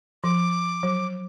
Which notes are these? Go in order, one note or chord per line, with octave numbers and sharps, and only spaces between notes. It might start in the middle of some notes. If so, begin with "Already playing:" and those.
F3 D6
F#3